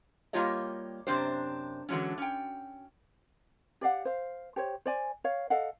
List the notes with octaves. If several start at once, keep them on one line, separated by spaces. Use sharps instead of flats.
G3 A#3 F4 G4 C#5 D#5
F#2 C3 C4 D4 G4 C5
D3 E3 F#3 G#3 C#4
C#4 G5
G4 D5 F5 F#5
C5 F5
G4 C5 C#5
C5 D5 G#5
C#5 F5
A4 D#5 F5 F#5